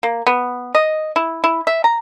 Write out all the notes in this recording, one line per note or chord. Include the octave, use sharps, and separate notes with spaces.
A#3
B3
D#5
E4
E4
E5
A#5